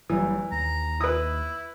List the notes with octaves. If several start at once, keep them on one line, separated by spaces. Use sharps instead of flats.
F#1 E3 F#3 G3
D#2 A#5
E4 B4 D#6